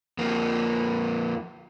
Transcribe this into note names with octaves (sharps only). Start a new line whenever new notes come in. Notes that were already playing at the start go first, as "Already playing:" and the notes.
F2 A#3